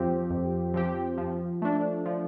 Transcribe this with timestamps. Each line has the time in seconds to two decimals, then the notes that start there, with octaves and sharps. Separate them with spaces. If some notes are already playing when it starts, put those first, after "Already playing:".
Already playing: F2 F3 C4 G4
0.30 F2
0.74 F3 C4 G4
1.18 F3
1.62 A3 D4
2.06 F3